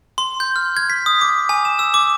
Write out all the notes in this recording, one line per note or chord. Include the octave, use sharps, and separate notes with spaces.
C6
G6
F6
G#6
B6
D#6
D6
G#5
E7
E6
D6